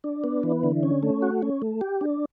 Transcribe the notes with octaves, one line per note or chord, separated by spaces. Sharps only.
D4
B3
E3
D3
C#4
A3
F#4
C#4
A3
G4
D4